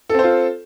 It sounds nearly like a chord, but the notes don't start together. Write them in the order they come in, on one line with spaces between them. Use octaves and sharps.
A4 C4 C5 F4